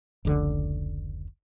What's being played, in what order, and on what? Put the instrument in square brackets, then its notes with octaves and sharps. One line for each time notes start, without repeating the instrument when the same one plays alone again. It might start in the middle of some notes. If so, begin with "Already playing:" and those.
[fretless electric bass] F1 C#2 D3